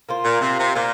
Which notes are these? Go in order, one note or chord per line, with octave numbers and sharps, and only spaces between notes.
A#3 F4 C5
A#2
C3
C3
A#2 A#3 F4 C5